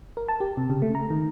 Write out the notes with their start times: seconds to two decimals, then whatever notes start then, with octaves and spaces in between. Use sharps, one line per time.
0.17 A#4
0.28 A5
0.40 G4
0.57 C3
0.70 C#3
0.82 A3
0.95 A#5
1.10 D#3